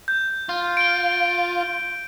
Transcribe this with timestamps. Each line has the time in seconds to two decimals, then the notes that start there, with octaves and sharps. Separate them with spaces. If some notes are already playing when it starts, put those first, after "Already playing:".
0.08 G6
0.49 F4
0.77 D7 G7